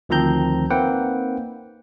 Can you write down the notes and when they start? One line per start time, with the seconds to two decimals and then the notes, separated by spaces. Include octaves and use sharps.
0.09 D2 D#3 F3 C4 A#5 G6
0.70 A#3 C4 D#4 B4 F#5 G5